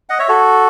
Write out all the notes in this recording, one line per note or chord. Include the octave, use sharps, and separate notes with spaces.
D#5 F#5
C#5 E5
F#4 A4